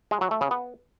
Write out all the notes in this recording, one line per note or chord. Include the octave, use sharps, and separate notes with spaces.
G#3
F#3
A3
C#3
B3